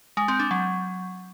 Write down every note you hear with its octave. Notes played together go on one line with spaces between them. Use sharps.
G#3
C4
D4
F#3